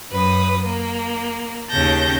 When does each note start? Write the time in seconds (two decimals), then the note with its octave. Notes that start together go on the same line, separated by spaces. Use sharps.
0.10 F#2 B4 D#6
0.65 A#3
1.69 D#2 C#3 C#4 A5 G6 A#6